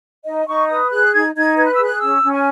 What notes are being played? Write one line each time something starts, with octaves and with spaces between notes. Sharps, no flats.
D#4 D#5
D#4 C#6
B4 D#6
G#4 F#6
D#4 G#6
D#4 G#6
B4 G#6
F#6
E6
G#4
F#6
C#4 E6
C#4
G#5